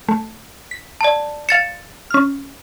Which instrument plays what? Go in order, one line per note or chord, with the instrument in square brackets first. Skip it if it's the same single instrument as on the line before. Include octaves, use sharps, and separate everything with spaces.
[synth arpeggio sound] A3
B6
[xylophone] D5 A5
[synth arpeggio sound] F5 E7 [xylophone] A6 C#7
[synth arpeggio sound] C#4 F6